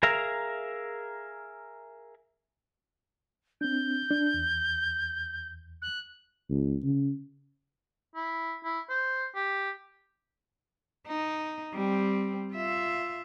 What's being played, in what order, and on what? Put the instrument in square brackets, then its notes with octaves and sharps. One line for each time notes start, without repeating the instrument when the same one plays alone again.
[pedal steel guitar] G#4 A#4 E5 F5 A#5
[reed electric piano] C4 D4 [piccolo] G6
[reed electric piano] D4
E2
[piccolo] F#6
[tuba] C#2
C#3
[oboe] E4
E4
C5
G4
[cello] D#4
G3 C4
F4 E5